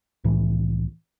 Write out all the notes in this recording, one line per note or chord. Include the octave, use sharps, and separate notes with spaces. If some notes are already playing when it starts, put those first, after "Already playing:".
C2 A2 E3